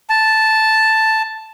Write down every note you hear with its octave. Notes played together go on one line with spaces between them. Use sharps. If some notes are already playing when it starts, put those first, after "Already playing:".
A5